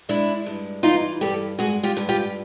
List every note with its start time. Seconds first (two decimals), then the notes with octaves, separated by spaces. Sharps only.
0.09 G#3 D4 E4
0.46 G2
0.83 E3 D#4 F4
1.21 G2 G4 A4
1.59 G#3 F#4 G#4
1.83 F4 G4
1.97 G2
2.09 F4 G4